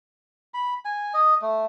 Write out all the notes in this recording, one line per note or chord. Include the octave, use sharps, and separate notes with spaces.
B5
G#5
D#5
A3